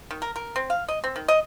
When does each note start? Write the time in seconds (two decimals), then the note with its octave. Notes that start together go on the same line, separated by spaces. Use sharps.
0.11 D#3
0.22 A#4
0.36 A#4
0.56 C4
0.70 F5
0.88 D#5
1.04 C4
1.16 D#3
1.28 D#5